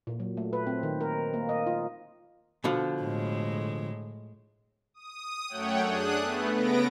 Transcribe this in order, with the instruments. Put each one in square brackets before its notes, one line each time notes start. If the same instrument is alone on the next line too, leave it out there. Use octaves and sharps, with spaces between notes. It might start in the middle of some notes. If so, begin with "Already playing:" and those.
[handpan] A#2
F#3
A3
B4
C4
D#3
A#4
A#3
D#5
F4
[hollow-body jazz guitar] B2 D3 F3
[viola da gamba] A2 G#3
[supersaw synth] D#6
F#2 A3 C#5 F#5 G5
D4 G#4 D#6 F#6
A3 B3
C#3 B3 B4 A#6 D7